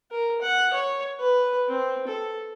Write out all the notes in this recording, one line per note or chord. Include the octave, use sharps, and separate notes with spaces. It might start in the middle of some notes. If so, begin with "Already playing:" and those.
A#4
F#5
C#5
B4
C4
A4